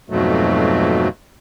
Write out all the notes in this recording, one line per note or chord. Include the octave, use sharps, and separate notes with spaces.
F2 G#2 B2 F#3 A3